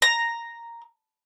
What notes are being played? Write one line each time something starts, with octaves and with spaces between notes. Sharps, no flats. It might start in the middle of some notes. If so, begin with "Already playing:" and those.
A#5